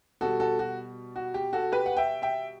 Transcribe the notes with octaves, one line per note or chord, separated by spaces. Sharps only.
B2 G3 F#4 A4
F#4 A4
F#4
F#4
G4
F#4 A4
G4 B4
F#5
E5 G5
E5 G5